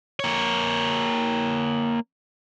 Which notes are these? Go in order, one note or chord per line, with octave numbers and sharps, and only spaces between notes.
A#3 C#5